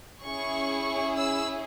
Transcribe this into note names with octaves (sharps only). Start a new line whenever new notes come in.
C#4 E4 G#4 C#6
E6